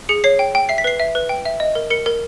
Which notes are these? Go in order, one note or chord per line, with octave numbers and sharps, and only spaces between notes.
G#4 C#7
C#5 C7
G5
G5
E5 C7
B6
B4 C7
E5
B4
G5
E5
D#5
A#4
A#4 C#7
A#4